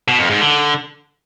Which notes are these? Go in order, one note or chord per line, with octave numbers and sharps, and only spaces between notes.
B2
F2
G#2
D3